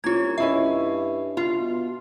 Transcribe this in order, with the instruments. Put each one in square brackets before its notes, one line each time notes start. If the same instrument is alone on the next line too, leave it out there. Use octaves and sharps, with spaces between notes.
[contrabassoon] C2 [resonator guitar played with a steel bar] A#3 C#4 [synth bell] F4 G#6
[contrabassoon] G2 [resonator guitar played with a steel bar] C#4 E4 D#5 [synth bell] E5
[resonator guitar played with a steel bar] F4
[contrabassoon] B2